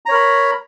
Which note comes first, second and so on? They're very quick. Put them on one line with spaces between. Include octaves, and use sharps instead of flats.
A#5 C#5 A#4 B5